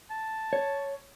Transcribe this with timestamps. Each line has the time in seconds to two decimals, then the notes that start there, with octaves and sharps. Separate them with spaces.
0.10 A5
0.53 C#5